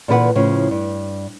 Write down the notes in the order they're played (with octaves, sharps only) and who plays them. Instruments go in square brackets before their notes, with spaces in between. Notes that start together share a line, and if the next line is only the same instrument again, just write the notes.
[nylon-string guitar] A#2 D3 E3 B4 D5 F#5
A2 C#3 F3
G2